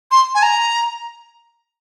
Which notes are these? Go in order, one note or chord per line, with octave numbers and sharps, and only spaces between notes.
C6
G#5
A#5